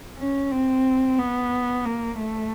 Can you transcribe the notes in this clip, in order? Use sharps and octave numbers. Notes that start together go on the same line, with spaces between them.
C#4
C4
B3
A#3
A3